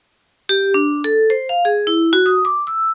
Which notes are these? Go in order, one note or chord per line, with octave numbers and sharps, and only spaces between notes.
G4
D4
A4
C5
F5
G#4
E4
F#4
D#6
D6
E6